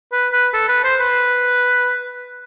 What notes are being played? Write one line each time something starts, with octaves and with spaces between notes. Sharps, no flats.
B4
B4
A4
B4
C5
B4